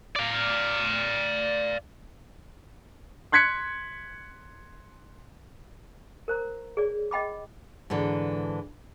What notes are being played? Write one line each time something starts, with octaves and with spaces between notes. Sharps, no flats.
D5 F5
C6 F#6 G#6 B6 C#7
A#4 C5 A#5
G#4 C#5 D5
D#5 G5 B5 D6
G#2 D3 E3 A4